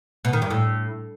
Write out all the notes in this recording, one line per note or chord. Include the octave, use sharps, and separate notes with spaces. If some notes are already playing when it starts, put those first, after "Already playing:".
B2
D#3
G2
A2